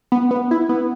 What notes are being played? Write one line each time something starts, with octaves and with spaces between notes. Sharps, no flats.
B3
B3
E4
B3